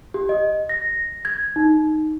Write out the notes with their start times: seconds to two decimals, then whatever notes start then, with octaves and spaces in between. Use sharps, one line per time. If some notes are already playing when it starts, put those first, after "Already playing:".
0.14 G4
0.29 D#5
0.69 A#6
1.25 G#6
1.56 D#4